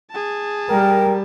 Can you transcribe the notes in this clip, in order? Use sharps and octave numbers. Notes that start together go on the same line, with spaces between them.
G#4 A5
G3 A#4 G5